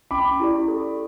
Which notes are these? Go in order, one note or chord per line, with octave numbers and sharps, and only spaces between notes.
C#4 B5 D6
E4 G4 D5
A4